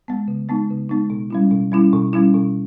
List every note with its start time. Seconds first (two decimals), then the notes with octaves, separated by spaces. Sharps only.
0.08 G#3 B3
0.28 C#3
0.49 G#3 B3 D#4
0.70 C#3
0.89 G#3 B3 D#4
1.10 B2
1.30 G3 C#4 E4
1.51 B2
1.72 G3 C#4 E4
1.93 B2
2.13 G3 C#4 E4
2.34 B2